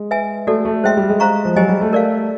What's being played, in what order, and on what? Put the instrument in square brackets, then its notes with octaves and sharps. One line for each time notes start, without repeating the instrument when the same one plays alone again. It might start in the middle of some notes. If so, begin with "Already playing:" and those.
Already playing: [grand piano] G#3
[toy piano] B4 E5 G#5
[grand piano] A3 [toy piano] F#4 A4 D5
[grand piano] A3
[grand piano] G#3 [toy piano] C5 E5 G5 C6
[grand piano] G3
G#3
[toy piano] C5 F5 A#5 C#6
[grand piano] F3
[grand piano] F#3 [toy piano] G4 C5 D#5 G#5
[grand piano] G3
A3
[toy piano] A#4 D5 F5